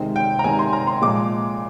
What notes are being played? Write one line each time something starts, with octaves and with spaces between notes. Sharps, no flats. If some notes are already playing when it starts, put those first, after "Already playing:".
Already playing: C3 D#3 G#3
G5
A#5
C3 D#3 G#3 G#5
C6
A#5
C6
A#2 F3 G#3 D6